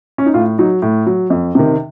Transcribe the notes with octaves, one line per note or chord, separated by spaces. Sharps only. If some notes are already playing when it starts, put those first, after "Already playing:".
C#4
D#4
A2 F4
F#3 D#4
A2
F#3
F2
C3 D#3